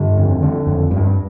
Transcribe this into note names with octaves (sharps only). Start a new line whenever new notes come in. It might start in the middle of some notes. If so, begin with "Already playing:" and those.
Already playing: G2 D3
F2
D3
F2
G2